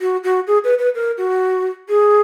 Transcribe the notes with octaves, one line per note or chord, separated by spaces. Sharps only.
F#4
F#4
G#4
B4
B4
A#4
F#4
G#4